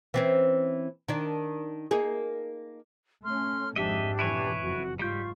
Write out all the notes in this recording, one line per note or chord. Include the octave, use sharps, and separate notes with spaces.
E3 C4 C#4
D#3 D4
A#3 D#4 G#4
A3 C#4 C6 F6
G#1 F2 G#2 D4 G4 D#5 E5
F2 B2 E3 E4 B4 C#5
F#1 F2 F#4
G#2 G3 F4 G4 C#6 G6